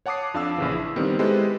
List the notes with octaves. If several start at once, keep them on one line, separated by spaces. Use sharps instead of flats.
C#5 F#5 A5 D6 D#6 C7
F2 D4 F5 D6 E6
A#1 C#3 E3
E4
D#3 G3 B3 C4
G#3 E4 G4 A4 B4 C5